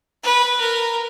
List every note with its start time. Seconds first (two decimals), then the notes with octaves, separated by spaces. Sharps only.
0.23 B4
0.60 A#4